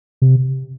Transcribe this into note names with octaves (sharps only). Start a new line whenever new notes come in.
C3